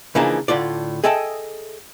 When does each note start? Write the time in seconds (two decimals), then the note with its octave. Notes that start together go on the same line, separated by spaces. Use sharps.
0.15 C#3 E3 F3 A#3 D4 D#4
0.48 A2 D3 F4 D5
1.04 G#4 A4 D#5 E5 G5 A5